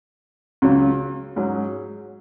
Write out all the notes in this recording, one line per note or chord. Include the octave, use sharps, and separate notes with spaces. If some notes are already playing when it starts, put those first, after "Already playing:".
C#2 C#3 F#3
G#2 F#3 C#4 G#4